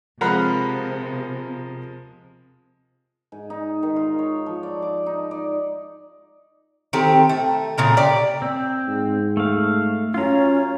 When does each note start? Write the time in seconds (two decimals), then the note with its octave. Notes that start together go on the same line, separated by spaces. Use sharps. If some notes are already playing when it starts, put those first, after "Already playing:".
0.21 C3 F3 G#3 A#4 F5 F#5 A#5 B5
3.32 G#2
3.50 D#4
3.83 D#3
3.96 F4
4.19 C#5
4.46 F3
4.63 D5
4.82 D6
5.06 D#4
5.31 D5
6.93 D#3 C4 G4 A4
7.29 A3
7.78 A#2 C#3 A#4
7.97 G4 D5
8.42 C4
8.88 G#2
9.37 A3 F5
10.14 F#2 C#4 F4 A#5